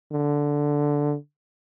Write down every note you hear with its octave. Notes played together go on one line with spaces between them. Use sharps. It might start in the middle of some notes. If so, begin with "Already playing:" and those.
D3